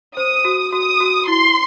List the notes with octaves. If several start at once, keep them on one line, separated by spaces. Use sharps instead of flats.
C5 D#6
F#4
F#4 D#6
F#4
E4 C6